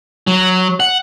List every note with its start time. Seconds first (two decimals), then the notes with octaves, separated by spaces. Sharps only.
0.27 F#3
0.80 F#5